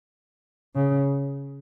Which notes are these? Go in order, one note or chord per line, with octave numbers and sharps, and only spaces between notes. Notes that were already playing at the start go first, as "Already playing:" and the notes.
C#3